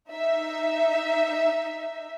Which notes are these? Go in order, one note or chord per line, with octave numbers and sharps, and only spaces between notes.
D#4 E5